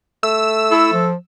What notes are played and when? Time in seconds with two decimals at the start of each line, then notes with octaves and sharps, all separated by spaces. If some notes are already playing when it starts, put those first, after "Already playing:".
0.23 A3 E6
0.71 E4 A4
0.94 F3